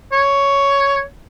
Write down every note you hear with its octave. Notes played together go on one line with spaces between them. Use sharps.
C#5